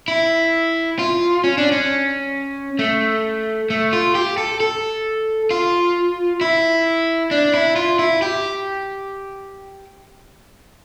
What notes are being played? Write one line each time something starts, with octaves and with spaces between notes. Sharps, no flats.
E4
F4
C#4
D4
C#4
A3
A3
F4
G4
A4
A4
F4
E4
D4
E4
F4
E4
G4